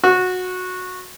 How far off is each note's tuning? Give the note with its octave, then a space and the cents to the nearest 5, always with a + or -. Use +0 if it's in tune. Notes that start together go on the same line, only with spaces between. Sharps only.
F#4 -15